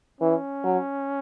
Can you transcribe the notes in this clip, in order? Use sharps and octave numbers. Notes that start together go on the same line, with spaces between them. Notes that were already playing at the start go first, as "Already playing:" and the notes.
E3 C#4
F#3